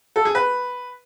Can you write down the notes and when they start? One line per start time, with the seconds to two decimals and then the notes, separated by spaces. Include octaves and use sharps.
0.16 A4
0.25 G#4
0.35 B4